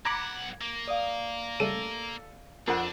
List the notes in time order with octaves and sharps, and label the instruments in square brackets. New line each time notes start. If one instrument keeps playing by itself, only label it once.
[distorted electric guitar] B1 F#5 [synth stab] A#5 B5 D6 [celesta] G#6
[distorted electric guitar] A#3
[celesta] D5 F5 [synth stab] D#6
[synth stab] C#3 G3 A3 [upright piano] A4 D#7
[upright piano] F2 [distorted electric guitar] D4 [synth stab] A#4 F#5